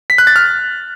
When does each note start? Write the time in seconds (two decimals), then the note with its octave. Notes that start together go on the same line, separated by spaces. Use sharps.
0.10 B6
0.18 F#6
0.27 A6
0.36 F6